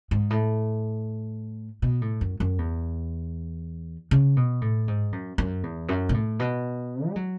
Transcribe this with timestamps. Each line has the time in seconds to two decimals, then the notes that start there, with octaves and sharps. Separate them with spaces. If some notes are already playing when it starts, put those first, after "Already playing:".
0.11 G#2
0.30 A2
1.82 B2
2.02 A2
2.21 F#2
2.40 F#2
2.58 E2
4.11 C#3
4.37 B2
4.61 A2
4.88 G#2
5.12 F#2
5.38 F#2
5.63 E2
5.89 F#2
6.09 B2
6.14 A2
6.39 B2
7.09 G#3
7.16 F#3